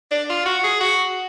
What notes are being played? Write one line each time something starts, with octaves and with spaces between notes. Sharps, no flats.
D4
F4
F#4
G#4
F#4